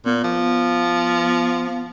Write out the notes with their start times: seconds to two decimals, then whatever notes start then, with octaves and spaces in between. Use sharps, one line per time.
0.06 A#2 B3
0.24 F3